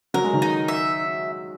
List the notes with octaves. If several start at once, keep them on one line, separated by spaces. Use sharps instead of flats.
F#3 A#4
G#3
D#3 F#3
D#4
E5